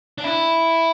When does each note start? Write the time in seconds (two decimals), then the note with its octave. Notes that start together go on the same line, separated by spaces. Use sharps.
0.18 D4
0.24 E4